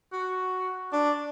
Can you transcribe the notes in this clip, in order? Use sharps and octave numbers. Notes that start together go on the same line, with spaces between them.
F#4
D4